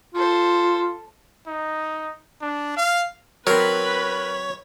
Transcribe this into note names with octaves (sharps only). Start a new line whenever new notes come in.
F4 A4 C5
D#4
D4
F5
F#3 C4 A#4 B4 C#5 B5